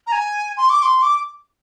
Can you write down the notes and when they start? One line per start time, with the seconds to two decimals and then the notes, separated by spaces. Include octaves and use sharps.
0.07 A#5
0.12 G#5
0.57 C6
0.70 D6
0.82 C6
1.02 D6